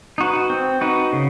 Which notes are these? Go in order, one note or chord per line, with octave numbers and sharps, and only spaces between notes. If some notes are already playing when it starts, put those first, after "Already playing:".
D#4 F#4 B4
C4
D#4 F#4 B4
C#3